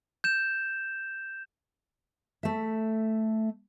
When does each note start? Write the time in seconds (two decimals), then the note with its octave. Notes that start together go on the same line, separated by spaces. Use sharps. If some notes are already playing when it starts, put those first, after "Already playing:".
0.24 G6 E7
2.43 A3 E5